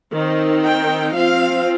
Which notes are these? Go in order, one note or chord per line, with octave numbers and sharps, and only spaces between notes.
D#3 C4 D#4
G5
F3 C4 F4 F5